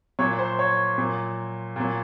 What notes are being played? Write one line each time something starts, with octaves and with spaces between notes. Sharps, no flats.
A#2 F#3 C#5
C5
C#5
A#2 F#3
A#2 F#3